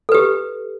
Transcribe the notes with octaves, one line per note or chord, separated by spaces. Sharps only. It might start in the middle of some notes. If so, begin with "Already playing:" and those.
G4 A4 B4